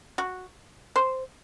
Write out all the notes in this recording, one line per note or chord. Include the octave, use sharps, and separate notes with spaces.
F#4
C5